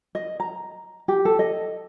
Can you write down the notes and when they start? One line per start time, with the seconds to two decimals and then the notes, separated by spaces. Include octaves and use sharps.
0.15 D#5
0.40 A#5
1.08 G4
1.25 A4
1.39 D#5